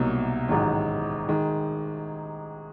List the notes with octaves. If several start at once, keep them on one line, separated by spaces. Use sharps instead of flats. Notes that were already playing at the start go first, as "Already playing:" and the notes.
Already playing: C2 B2 F#3 A#3 D#4
A1 G#2 D#3 F#3
D#3 G#3